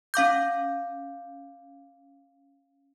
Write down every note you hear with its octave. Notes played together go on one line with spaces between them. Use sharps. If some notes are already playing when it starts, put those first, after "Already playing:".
C#4 F5 D6 G6